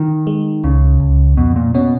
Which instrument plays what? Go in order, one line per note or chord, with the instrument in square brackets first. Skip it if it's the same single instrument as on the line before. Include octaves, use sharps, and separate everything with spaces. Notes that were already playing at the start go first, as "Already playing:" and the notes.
Already playing: [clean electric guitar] D#3
[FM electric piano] G#3
[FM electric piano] C#2 [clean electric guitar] C#3
[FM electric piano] C#2
[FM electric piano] F2 [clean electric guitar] B2
[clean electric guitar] A#2
[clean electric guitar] B2 [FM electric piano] C#4